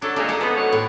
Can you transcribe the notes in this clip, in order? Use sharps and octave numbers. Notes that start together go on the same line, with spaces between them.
F#3 D4 A4
A#2 G#3 D4
D#4 A4 A#5
B3 A4 C5
B2 C#5 F#5
A2